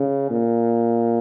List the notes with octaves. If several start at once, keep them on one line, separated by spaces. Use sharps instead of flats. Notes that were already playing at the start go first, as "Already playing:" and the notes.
Already playing: C#3
A#2